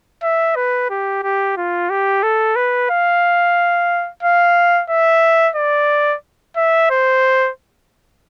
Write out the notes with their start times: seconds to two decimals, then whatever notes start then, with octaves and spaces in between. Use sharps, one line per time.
0.23 E5
0.56 B4
0.90 G4
1.23 G4
1.57 F4
1.90 G4
2.23 A4
2.56 B4
2.90 F5
4.23 F5
4.90 E5
5.56 D5
6.57 E5
6.90 C5